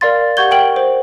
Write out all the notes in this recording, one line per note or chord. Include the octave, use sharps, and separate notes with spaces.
A#4 D5 F5 C6 A6
G4 F#5 C#6 G6 G#6 G7
A#4 G5 D7 F#7
C5